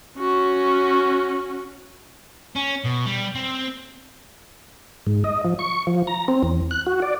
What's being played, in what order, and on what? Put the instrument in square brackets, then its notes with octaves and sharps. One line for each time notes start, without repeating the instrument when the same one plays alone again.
[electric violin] C#4 F#4
[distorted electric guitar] C#4
B2
G3
C4
[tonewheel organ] G#2
D#5
F3
C#6
F3
A#5
C4
E2
F#6
F#4
D5